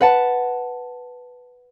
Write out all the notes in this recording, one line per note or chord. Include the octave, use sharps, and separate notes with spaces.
B4 F#5 A5